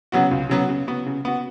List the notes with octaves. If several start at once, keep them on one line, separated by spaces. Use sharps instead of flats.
C#3 F#3 B3 F#4
C#2
C#3 F#3 B3 F#4
C#3
B3 F#4
C#3
B3 F#4